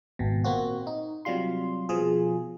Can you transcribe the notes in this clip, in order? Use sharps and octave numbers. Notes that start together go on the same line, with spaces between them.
G#1 B2
A#2 A#3 C4 F#4
D#4
C3 F#3 G3 F4 C6
B2 F3 F4 G#4